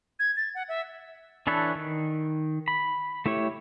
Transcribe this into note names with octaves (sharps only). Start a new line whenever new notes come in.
G#6
A6
F#5
E5
E3 D4 A4 B4 C#5
D#3
B5
A3 E4 G4 C#5